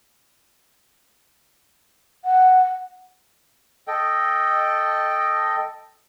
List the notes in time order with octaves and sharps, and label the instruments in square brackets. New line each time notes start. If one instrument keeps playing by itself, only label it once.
[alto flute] F#5
[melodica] A4 D#5 G5